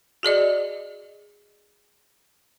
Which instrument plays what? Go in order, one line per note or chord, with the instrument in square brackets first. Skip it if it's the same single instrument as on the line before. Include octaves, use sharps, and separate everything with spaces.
[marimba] F#4 G#4 D5 D#5